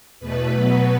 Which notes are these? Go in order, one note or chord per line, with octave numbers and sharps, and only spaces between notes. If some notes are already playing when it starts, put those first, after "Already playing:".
E2 B2 A3 B4
B2 F#3 B3